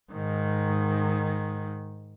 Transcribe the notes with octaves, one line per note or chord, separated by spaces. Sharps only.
G#2 D#3